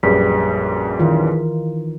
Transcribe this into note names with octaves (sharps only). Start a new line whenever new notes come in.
A#1 F#2 G3 G#4 B4 B6
D#3 E3 F4